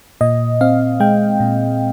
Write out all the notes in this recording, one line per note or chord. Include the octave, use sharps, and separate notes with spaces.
A#2 D#5
C4 F5
G#3 G5
A#2